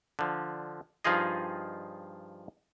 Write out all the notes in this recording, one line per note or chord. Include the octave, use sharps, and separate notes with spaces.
D3 F3
G2 F3 D#4 F4 G#4 D#5